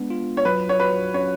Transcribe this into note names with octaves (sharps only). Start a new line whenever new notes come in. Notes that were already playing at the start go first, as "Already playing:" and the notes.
Already playing: G#3 B3 D4
F4
C#5
F#3 B4
C#5
F#4 B4
C#4 C#5